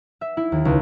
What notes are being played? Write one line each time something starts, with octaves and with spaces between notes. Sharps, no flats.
E5
E4
D#2
C#2